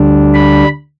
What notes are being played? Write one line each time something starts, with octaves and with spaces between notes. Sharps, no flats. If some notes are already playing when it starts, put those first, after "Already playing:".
Already playing: D2 D3 G3 D4
B5